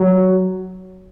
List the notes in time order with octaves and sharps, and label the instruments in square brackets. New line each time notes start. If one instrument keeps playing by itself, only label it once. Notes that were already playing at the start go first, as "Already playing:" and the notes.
Already playing: [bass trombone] F#3